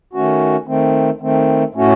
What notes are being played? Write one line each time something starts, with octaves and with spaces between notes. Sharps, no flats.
D#3 A3 C#4 F#4
D#3 A3 C4
D#3 A3 C4
A2 A3 C#4 F#4